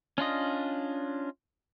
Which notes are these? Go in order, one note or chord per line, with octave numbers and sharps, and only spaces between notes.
C#4 D4 F4 D#5